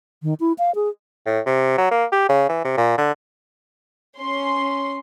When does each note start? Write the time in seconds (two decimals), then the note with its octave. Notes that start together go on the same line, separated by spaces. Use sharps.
0.23 D#3
0.40 E4
0.58 F5
0.75 G#4
1.26 A2
1.46 C3
1.78 F#3
1.91 A#3
2.12 G4
2.29 C#3
2.49 E3
2.64 C3
2.77 A#2
2.97 D3
4.19 C#4 C6